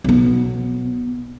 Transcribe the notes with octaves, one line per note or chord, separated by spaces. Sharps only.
B1 B3